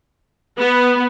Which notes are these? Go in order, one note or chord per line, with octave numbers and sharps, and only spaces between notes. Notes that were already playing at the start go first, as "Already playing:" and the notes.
B3